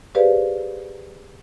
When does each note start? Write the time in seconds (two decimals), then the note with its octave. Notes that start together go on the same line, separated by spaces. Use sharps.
0.15 G4 G#4 B4 C5 D5 F5